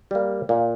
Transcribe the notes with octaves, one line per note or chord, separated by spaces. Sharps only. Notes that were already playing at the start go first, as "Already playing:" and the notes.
G3 A#3
A#2